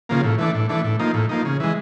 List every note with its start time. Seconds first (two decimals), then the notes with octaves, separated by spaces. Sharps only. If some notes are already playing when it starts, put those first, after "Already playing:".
0.09 C#3 F3 A#3
0.24 A2
0.38 E3 A3 D4
0.55 A2
0.69 E3 A3 D4
0.84 A2
0.99 F3 A#3 D#4
1.14 A2
1.29 F3 A#3 D#4
1.45 C#3
1.60 E3 G#3